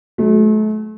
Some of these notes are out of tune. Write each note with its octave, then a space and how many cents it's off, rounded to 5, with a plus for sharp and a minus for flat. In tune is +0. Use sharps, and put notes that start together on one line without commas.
F#3 +0 A3 -40